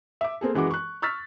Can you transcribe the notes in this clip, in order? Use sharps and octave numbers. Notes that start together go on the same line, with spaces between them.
E5 D6
A#3 C4 G#4 A4
F#2 E3 G#3 F#4 D6
C#6 F#6
C#6 E6 F6 A6 B6